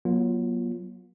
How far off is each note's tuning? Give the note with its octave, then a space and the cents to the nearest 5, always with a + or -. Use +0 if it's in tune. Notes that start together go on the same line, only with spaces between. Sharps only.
F#3 +0 A#3 +45 F4 -5